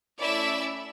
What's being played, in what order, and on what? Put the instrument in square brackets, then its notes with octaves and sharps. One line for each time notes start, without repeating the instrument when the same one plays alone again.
[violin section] A3 C#4 E4 D5 E5